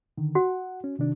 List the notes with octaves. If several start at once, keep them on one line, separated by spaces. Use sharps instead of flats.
D3 D#3
F#4 F#5
C#4
C3 D#3 D4